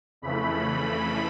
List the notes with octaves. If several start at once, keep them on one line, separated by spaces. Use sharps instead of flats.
F2 C#3 E3 A3 B5